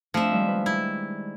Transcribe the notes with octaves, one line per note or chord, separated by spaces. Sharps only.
F3 A3 C4 D4 E5
D#3 G3 G#3
B4
E4